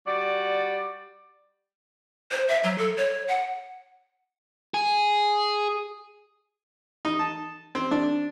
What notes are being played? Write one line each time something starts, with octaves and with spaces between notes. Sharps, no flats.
G3 F#4 D5
C5
E5
F#3
A4
C#5
F#5
G#4
D#4
A5
C4
D4